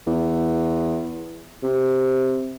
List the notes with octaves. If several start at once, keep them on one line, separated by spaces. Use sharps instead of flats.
E2
C3